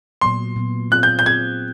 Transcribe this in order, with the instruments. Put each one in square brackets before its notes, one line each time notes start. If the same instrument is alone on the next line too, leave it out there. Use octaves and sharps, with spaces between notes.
[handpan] A#2 F#3 B3 [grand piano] C6
[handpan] A#2 F#3 B3
[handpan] C4 F4 G#4 [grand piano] F#6
[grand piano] G6
G6
[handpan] C4 F4 G#4 [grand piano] G#6